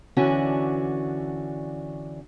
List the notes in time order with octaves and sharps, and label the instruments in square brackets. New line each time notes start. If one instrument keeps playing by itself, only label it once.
[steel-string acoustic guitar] D3 E3 C#4 D4 F#4